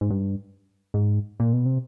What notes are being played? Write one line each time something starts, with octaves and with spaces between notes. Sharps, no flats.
G#2
G2
G#2
A#2
B2
C3